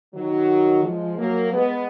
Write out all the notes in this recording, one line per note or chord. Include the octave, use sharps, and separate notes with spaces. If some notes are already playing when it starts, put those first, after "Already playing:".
D#3 F#3
F3 G#3
F#3 A#3
G#3 B3